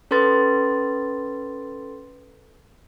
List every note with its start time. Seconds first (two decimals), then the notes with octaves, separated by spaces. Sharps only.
0.11 C#4 A4 B4 C6 A6